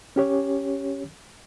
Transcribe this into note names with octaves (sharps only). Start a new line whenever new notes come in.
C#4 G4 C#5